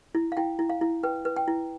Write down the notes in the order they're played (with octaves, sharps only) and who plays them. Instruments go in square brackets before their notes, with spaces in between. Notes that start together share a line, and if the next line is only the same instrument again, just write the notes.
[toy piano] E4
F5
E4 G5
E4
F5
E4
B4 G5
B4
G5
E4